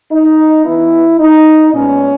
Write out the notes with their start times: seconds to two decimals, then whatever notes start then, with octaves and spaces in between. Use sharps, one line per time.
0.12 D#4
0.65 E3 B3 E4
1.20 D#4
1.74 A#2 G#3 B3 C#4